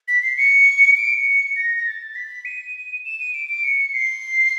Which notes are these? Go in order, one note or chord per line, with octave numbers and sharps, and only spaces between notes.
B6
C7
C#7
D7
C#7
A#6
A#6
A6
A6
B6
D#7
E7
D#7
D7
D7
C#7
C7